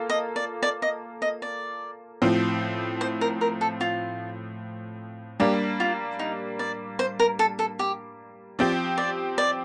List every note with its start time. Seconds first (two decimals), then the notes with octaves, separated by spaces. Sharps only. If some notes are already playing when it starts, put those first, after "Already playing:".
Already playing: A#3 F4 A4
0.10 D#5
0.36 D5
0.63 D5
0.82 D#5
1.22 D#5
1.42 D5
2.22 A2 F3 C4
3.01 C5
3.21 A#4
3.41 A#4
3.61 A4
3.81 F4
5.40 G3 A#3 D4 G4
5.80 F4
6.19 D#4
6.59 D5
6.99 C5
7.20 A#4
7.39 A4
7.59 A4
7.79 G4
8.59 F3 C4 G4 D5
8.98 D5
9.38 D5